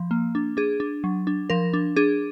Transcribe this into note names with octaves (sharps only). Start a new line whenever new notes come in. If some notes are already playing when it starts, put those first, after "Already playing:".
Already playing: F3
A#3
D4
D4 G#4
D4
F#3
D4
F3 A#4
D4
D4 G#4